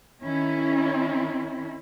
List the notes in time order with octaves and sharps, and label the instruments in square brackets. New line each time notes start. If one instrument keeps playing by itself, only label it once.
[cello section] D#3 C#4 E4